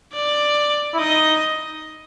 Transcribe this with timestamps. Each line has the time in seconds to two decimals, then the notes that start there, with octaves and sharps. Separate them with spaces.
0.13 D5
0.94 E4
1.00 D#4 D#5